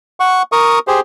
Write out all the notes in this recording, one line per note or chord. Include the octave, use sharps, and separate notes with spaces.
F#5 C#6
A#4 C#6 D#6
G4 G#4 C5